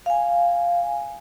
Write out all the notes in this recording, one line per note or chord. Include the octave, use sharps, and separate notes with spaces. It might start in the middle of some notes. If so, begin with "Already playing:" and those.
F5 G#5